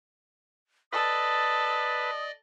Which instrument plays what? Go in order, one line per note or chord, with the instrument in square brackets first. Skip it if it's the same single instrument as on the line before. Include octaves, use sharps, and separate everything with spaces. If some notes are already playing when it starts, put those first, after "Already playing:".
[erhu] A4 [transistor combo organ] B4 [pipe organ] D5 D#5 [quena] D#6